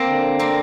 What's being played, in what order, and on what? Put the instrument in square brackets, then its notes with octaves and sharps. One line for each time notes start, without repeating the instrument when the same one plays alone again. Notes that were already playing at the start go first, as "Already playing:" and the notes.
Already playing: [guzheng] A#3 C4
[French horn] D3
[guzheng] A#3 C4